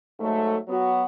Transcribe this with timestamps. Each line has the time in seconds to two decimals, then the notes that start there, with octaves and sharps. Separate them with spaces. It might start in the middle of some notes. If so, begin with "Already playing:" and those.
0.19 G#2 F#3 A3
0.68 F#3 B3 F#4